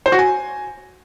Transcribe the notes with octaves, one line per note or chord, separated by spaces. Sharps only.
C5
F#4
G#5